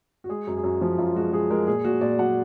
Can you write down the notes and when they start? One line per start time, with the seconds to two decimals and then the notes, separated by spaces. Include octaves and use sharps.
0.24 F#4
0.29 G#3 G#4
0.47 F#2
0.57 G#4
0.64 F#2 F#4
0.81 F3
0.98 F#2 F4
1.15 G#3 F#4
1.32 G#3 G#4
1.50 G#3 A#4
1.67 A#2 G#4
1.84 A#2 F#4
2.01 A#2 D5
2.19 F#3 F#5